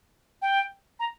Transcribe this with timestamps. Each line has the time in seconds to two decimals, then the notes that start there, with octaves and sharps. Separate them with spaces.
0.42 G5
1.00 A#5